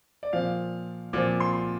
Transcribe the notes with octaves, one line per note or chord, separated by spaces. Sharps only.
D5
A#2 F3 F5
A#2 F3 D6
C6